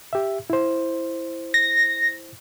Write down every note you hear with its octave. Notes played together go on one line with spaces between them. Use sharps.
G4 E5
E4 C5
A#6